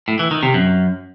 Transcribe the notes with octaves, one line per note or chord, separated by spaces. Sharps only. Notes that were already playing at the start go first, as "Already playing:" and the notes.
A2
E3
D#3
C3
F#2